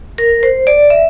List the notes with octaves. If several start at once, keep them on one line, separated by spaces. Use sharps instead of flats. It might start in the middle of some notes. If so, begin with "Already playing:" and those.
A#4
C5
D5
E5